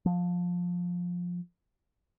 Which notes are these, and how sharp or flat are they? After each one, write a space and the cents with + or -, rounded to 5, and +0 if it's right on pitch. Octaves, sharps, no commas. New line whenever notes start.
F3 +15